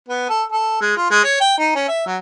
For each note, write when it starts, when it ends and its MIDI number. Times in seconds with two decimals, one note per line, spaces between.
0.09 0.28 59
0.29 0.43 69
0.52 0.78 69
0.81 0.96 56
0.97 1.06 65
1.10 1.20 56
1.24 1.39 73
1.41 1.53 79
1.58 1.70 63
1.75 1.85 61
1.88 2.04 76
2.06 2.17 54